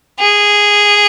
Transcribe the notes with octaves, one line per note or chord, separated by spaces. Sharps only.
G#4